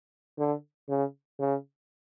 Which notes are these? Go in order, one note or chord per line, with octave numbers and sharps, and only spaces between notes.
D3
C#3
C#3